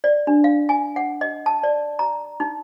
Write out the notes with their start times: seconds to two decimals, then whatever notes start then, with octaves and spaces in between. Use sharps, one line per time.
0.04 D5
0.27 D4
0.44 F5
0.69 G#5
0.96 F#5
1.21 D#5
1.46 A5
1.63 D5
1.99 A#5
2.40 D#4